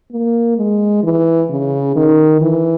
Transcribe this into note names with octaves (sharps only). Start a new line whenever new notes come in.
A#3
G#3
E3
C#3
D#3
E3